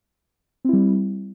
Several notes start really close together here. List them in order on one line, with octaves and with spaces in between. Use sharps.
C4 E4 G3